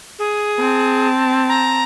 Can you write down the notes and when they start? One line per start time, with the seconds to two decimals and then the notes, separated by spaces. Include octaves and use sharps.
0.19 G#4
0.59 C4 A5
1.49 A#5